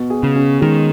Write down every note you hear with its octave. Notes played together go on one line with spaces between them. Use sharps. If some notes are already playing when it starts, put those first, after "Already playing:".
Already playing: B2
G#4
C#3
C#4
D#3 G#3